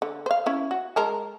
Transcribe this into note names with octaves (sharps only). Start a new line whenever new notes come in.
D3
C5 F5
C#4 E4
F#4
G#3 A#4 A5